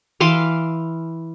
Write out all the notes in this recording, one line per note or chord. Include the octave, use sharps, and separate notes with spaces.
E3 F5 C6 D6